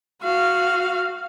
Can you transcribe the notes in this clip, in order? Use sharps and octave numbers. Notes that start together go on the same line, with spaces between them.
F#4 F5